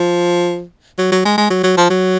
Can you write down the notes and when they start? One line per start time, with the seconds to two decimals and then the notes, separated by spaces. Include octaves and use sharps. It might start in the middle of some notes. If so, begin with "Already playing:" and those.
Already playing: F3
0.98 F#3
1.12 F#3
1.25 G#3
1.38 G#3
1.50 F#3
1.64 F#3
1.77 F3
1.90 F#3